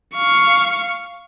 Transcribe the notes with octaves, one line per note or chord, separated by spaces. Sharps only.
F5 C#6